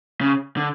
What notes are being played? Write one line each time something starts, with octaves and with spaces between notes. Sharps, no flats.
C#3
D3